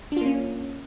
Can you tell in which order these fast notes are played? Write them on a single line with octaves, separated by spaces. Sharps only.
D4 F4 A#3 C#4